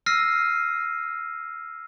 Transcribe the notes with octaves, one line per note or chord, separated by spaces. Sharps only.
E6 F6 A#6 C7 D#7